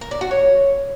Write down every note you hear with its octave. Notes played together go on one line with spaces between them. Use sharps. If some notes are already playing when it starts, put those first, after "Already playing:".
A#4
D5
F#4
C#5